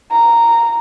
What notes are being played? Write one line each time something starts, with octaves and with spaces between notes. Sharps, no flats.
A#5